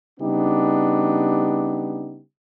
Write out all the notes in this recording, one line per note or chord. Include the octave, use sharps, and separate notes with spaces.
C#3 G3 B3 D4 D#4 G4